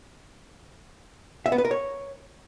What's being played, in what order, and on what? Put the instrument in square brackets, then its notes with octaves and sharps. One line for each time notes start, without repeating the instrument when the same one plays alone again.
[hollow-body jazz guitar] E5
B3
B4
A#4
C#5